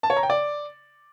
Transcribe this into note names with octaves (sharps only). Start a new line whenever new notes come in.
A5
C#5
A#5
G5
D5